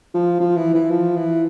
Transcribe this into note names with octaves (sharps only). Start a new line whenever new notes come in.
F3
F3
E3
E3
F3
E3